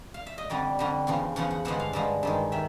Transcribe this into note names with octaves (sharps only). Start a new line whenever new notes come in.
F5
E5
D#5
F2 D3 G3 D5
F2 D3 G3
E2 C#3 F3
E2 C#3 F3 F#5
F#5
G2 D3 F3 G#3 F#5
F5
G2 D3 F3 G#3
G2 D#3 G#3
D#3 E5